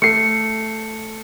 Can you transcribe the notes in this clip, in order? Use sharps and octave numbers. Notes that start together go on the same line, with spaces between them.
A3 C7 C#7